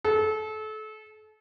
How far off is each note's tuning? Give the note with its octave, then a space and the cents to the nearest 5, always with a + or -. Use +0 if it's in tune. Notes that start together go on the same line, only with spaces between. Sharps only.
A4 -30